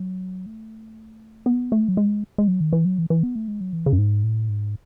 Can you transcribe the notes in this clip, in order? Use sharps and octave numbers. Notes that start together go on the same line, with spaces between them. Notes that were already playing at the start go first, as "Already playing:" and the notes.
Already playing: F#3
A3
B3
A3
F#3
G#3
G#3
F#3
D#3
E3
F#3
E3
E3
B3
A3
G#3
F#3
E3
C#3
F#2
G#2
A2
G#2